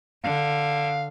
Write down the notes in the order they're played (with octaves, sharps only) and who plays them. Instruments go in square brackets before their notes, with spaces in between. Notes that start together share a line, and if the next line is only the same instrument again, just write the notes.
[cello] D3 [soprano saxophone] F5